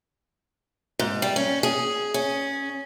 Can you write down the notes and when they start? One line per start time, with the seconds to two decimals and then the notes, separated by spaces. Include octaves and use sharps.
0.99 G#2
1.22 G3
1.36 C#4
1.63 G#4
2.14 C#4